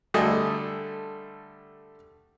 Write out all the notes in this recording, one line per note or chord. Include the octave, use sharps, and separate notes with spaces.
D3 G3 A3 D#5 G#5